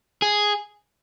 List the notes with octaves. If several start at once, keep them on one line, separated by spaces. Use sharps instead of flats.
G#4